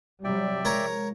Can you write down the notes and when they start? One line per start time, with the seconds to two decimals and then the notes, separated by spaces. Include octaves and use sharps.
0.24 C3 F#3 G3 D5 E5 G5
0.65 F3 G#3 A#4 C#5 A#5